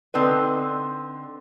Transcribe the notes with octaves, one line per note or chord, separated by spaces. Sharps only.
D3 C4 D#4 B4